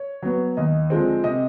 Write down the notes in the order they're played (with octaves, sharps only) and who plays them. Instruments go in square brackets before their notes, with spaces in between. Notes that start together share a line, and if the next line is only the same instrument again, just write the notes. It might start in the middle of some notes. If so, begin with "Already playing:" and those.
Already playing: [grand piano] C#5
F#3 B3
D#2 D#5
D3 F3 G#3 C4
C3 D#5